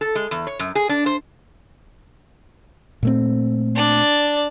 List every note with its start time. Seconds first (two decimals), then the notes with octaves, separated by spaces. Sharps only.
0.01 A4
0.15 G#3
0.31 E2
0.47 C#5
0.59 F#2
0.75 G#4
0.89 D4
1.06 C5
3.03 A#2 A3 C4
3.75 D4 D5